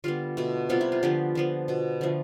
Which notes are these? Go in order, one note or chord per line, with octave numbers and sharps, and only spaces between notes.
D3 G3 B3 F4
B2 A3
C3 G3 B3 F4
E4
F4
D3 F3 B3 G4
D3 F3 B3
B2 B3
D3 F3 A3